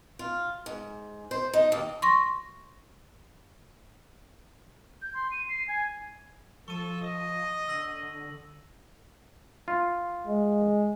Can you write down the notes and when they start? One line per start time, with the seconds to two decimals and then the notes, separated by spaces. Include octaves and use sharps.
0.19 F4
0.66 G#2
1.31 C5
1.53 D#4
1.72 D#2
2.02 C6 C#6 A#6
5.02 G6
5.14 C6
5.31 D#7
5.49 C7
5.68 G#5
6.68 F3 A4 C#6 D#7
7.02 D#5
7.68 D3 E6 A#6 F#7
9.68 F4
10.26 G#3